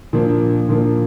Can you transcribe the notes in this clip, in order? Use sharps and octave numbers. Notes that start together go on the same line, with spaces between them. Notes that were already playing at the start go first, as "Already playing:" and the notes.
A#2 F3 A#3 D4
A#2 F3 A#3 D4